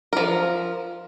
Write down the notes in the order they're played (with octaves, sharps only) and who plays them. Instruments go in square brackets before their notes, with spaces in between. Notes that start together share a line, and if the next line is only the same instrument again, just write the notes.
[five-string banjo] F3 A#4